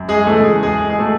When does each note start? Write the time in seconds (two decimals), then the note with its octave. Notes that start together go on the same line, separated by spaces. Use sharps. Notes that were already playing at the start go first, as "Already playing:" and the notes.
Already playing: F#2
0.08 G#3 G#4
0.27 C#3 E3 A3 A4
0.44 G#3 G#4
0.63 E2 G#3 G#4
0.90 G#4
0.99 B2 A3 A4